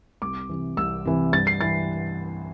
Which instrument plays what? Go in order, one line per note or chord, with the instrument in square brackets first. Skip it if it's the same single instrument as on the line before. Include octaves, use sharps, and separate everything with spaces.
[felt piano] C2 D6
C3 E3
C2 E6
C3 E3
G2 A6
C7
E3 A6